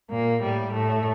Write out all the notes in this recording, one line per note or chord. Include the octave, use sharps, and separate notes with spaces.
A#2 A#3
A2 G3
A2 A3